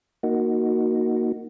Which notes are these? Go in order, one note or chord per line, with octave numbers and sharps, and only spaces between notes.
A#3 D#4 F#4